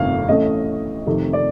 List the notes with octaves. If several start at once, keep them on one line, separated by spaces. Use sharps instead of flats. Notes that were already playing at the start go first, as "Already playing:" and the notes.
Already playing: G1 F2 C3 D#3 A3 F5
A1 A2 A3 D#5
F2 C3 D#3 A3
D5